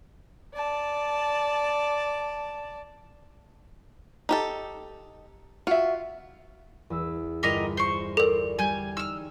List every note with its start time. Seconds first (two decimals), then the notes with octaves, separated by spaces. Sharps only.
0.54 D5 A5
4.29 D#4 G4 A4
5.67 F4 F#4 E5
6.90 E2 E6
7.43 G1 G4 A#4 D#5
7.77 C5 C#6
8.17 A4 A#4 D5
8.59 G3 G#5 G6 G#6
8.97 D#4 E6 F6